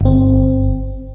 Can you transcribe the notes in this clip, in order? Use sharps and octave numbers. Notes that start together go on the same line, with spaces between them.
G1 C4